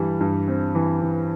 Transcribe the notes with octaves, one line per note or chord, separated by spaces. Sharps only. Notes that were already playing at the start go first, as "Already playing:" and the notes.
Already playing: G2 E3 G3
G2
C4
E3
E3